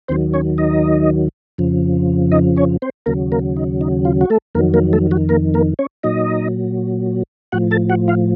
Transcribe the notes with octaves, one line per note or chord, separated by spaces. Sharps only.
D#2 D#3 F#3 C4 C5
C#4 C#5
D#4 D#5
F2 C#3 F3
D#4 D#5
C#4 C#5
C4 C5
D#2 C#3 F#3 A#3 A#4
A#3 A#4
D#4
D#4
F4
F#4
A3 A4
F2 D#3 F#3 A#3 A#4
A#3 A#4
A3 A4
F#3 F#4
A#3 A#4
A#3 A#4
C#4 C#5
A#2 F#3 D#4 D#5
A2 F3 F#4 F#5
A4 A5
F#4 F#5
F4 F5